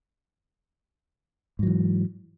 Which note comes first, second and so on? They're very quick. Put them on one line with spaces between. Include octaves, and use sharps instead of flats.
G#2 F#3 E3